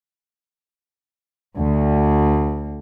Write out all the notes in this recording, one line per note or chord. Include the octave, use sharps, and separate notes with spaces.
D2